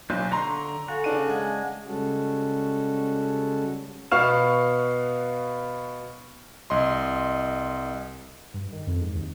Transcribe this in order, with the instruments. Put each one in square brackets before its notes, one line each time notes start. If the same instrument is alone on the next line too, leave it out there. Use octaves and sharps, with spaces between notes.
[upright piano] B1 [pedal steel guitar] D4 C5
[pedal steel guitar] D3 C#6 [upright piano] A#5 C6
[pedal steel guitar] F#4 [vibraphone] A4 F5 G#5
[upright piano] C#3 D4 D#7
[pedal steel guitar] G#3 [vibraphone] F#5 G#5
[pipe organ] C#3 G3 G#3 C#4 F#4 A4
[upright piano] B2 B3 F5 C#6 F6 E7
[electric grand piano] C2 D#5 C6
[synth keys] G2
D#3
F2
G#2
D#2